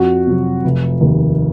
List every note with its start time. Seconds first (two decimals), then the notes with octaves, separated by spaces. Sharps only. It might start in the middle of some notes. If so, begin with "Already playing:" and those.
Already playing: F2 F#4
0.27 C3 F#3
0.64 F1
1.01 D#2 D#3